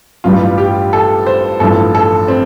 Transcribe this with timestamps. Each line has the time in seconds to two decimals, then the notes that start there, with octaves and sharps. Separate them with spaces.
0.24 A1 G2 G3 F4
0.58 G4
0.93 A4
1.26 C5
1.60 A1 G2 F3 A4
1.95 A4
2.28 C4